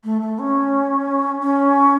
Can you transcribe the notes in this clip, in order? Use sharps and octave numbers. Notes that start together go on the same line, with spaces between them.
A3
A3
C#4
C#4